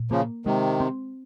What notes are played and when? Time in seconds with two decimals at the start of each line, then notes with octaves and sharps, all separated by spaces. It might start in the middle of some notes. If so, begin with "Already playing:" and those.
Already playing: A#2
0.11 C#3 F3 A#3
0.45 C3 D#3 G#3
0.80 C4